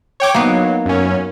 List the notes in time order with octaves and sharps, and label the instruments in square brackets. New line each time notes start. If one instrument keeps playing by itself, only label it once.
[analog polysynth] C#5 G5 D6
[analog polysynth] F#3 [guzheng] A#3 B3 D#4
[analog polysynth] F#2 C#4